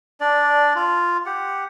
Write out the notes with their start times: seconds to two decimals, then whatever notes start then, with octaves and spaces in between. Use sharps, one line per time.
0.20 D4 D5
0.76 F4
1.26 G4 F#5